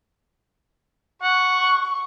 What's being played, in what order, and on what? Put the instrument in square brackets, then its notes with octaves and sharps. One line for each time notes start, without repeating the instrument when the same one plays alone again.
[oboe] F#5 [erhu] C#6